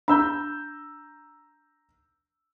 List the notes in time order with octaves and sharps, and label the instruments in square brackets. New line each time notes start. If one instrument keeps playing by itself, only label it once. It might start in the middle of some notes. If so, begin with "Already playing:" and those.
[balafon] D4 [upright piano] A#5 E6 G6